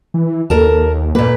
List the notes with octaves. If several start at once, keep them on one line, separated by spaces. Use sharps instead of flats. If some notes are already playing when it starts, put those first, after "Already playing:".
E3
D#2 A#4 A5
A#2 A#3 B4